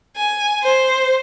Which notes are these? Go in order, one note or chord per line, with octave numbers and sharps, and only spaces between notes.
G#5
C5